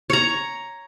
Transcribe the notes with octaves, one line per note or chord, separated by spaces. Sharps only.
C#5 A#5